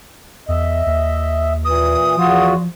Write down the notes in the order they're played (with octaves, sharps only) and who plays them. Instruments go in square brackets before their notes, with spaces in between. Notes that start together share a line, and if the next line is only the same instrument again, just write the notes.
[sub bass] E2 [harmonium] D#5 E5
[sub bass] D#2
[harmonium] A#2 E3 [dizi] D#6
[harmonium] E2 F4 F#4 [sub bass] F3